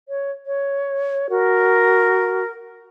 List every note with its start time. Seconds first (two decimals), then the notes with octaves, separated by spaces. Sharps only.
0.09 C#5
0.46 C#5
1.30 F#4 A#4